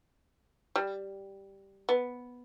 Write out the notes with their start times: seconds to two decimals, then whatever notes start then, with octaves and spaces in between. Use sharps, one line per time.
0.76 G3
1.89 B3